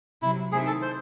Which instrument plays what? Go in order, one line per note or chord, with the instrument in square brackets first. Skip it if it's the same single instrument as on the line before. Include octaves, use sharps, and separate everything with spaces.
[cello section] C3 F#3 C4 [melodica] E4
[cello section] C3 D#3 A3 C4 E4 [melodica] G#4
[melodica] A4
C5